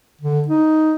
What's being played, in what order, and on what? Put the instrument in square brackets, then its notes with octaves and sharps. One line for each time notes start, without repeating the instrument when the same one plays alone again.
[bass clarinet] D3
D#4